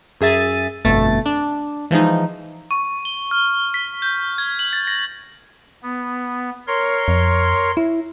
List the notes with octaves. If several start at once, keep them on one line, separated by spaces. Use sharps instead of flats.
F#2 G#4 E5 A6 D#7
G1 F2 B2 A3 A6
D4
E3 F3 G#3 D#4
C#6
G7
F6
B6
G6
G#6
F#7
A6
A#6
B3
A#4 C#5 C6
F2
E4